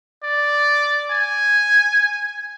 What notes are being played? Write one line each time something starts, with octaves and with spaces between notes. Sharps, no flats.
D5
G#5